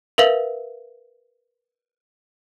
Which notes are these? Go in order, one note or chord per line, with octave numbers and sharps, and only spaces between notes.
A#4 B4 E5 F5 F#7